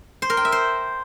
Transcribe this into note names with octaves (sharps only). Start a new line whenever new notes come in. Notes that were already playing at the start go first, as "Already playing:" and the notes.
C5
A#4
G5
E5
C5